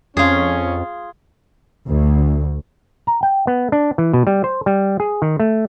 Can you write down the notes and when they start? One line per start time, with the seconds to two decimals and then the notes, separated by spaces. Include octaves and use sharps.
0.17 F2 C#4 F4 G#4
1.88 D2
3.07 A#5
3.23 G5
3.47 B3
3.72 D4
3.98 E3
4.13 B2
4.27 G3
4.44 C5
4.66 G3
5.00 G#4
5.22 D#3
5.40 A3